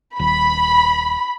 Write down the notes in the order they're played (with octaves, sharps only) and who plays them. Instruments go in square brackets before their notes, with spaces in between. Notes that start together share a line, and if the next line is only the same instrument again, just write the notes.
[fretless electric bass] D#1 [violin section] B5